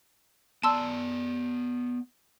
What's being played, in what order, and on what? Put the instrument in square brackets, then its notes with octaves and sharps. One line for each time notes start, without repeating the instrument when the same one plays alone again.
[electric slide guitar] B3 D5 [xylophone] A5 C6 E6